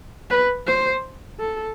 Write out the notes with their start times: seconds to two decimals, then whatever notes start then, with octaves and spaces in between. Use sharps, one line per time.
0.30 B4
0.67 C5
1.39 A4